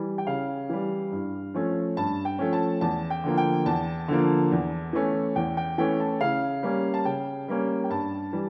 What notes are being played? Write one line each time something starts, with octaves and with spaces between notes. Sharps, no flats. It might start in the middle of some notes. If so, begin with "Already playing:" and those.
Already playing: E3 G3
G5
C#3 F5
E3 G3
G2
F3 A3 C#4
G2 A5
G5
F3 A3 C#4
A5
E2 A5
G5
D3 F3 A#3
G5
E2 A5
D3 F3 A#3
E2
E3 A3 C#4
E2 G5
G5
E3 A3 C#4 G5
A5
C#3 F5
G3 A#3 C#4
A5
C#3 G5
G3 A#3 C#4
G5
G2 A5
E3 G3